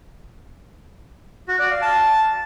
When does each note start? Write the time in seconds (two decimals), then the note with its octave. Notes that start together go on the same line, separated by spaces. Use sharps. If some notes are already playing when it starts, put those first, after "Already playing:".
1.48 F#4
1.59 D5
1.71 F5
1.82 A5